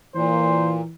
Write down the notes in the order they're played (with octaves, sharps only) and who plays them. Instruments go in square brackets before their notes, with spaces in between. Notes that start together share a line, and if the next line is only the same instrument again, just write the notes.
[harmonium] A#2 [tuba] E3 [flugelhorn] C5